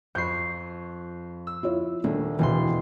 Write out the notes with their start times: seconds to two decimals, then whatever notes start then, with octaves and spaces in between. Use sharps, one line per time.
0.15 F2 B5 C#6 G6 C7
1.47 E6
1.63 E4 F4 C#5
2.04 D#1 A3 D4
2.39 E1 D2 B2 E3 C6